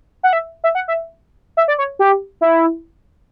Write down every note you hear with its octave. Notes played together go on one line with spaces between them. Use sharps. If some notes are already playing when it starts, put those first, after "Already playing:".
F#5
E5
E5
F#5
E5
E5
D5
C#5
G4
E4